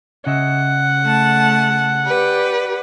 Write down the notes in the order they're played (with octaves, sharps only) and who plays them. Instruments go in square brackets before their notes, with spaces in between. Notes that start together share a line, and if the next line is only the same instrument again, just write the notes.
[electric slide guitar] C#3 D#5 E5 [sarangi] F#5
[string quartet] A3 A5
G4 B4 D5